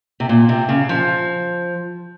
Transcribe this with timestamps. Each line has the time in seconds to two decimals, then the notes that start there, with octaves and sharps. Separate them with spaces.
0.20 C3
0.29 A#2
0.49 C3
0.69 C#3
0.89 F3